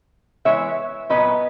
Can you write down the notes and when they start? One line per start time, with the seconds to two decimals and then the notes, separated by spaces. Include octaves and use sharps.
0.45 E3 G#3 B3 C#5 E5
1.10 A#2 F#3 B3 B4 D#5